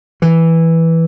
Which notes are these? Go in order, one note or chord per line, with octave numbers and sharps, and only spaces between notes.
E3